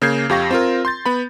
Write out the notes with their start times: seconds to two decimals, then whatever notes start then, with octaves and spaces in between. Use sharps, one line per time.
0.02 C#3 A#3 G6 G#6 C7
0.29 F2 G4 F5 C#6 A#6
0.51 C4 F4 A#4
0.85 C6 G6 A6
1.06 B3 B5